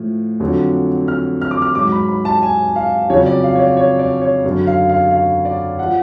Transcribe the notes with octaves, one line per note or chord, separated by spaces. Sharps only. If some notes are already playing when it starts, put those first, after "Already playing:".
Already playing: A2 F3
F2 D3 F#3
F6
F6
D6
F6
G#2 F#3 D6
B5
B5
A5
G#5
F5
F2 C#3 F#3 C#5
D5
F5
C#5
D5
C#5
D5
C#5
F#2 D3 F#3
F5
F5
F5
D5
F3 F#5